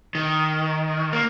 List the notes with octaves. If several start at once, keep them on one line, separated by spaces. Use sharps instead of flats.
D#3
A#3